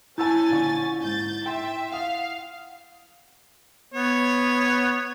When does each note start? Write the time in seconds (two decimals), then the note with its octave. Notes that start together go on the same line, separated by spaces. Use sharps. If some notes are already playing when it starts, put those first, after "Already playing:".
0.18 C#4 E4 G#5 A5 E6 G6 A6
0.50 A#1 D3 C#6
1.03 G#2 G6 A6
1.46 E5 G5 C6
1.92 F5 F#5 D#6
3.94 B3 C#5